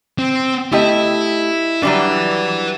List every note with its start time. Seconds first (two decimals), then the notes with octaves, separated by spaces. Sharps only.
0.19 C4
0.72 A3 E4 G4 D#5
1.83 F#3 G3 D4 B4 E5